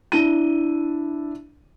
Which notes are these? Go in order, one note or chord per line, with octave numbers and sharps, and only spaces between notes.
D4 E4 D#7